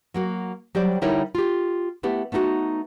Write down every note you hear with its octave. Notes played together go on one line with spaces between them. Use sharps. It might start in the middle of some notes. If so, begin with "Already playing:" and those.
F#3 A#3 F#4
F#3 G3 G4 C5 D5
D3 G3 D#4 E4 A#4 C#5
F4 G4
A3 B3 E4 G4
A3 B3 D#4 F4 F#4